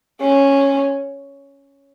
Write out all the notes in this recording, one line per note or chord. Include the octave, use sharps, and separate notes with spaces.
C#4